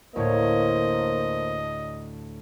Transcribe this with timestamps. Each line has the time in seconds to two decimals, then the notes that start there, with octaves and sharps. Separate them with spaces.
0.16 D2 A2 A#3 C5 C#5 D#5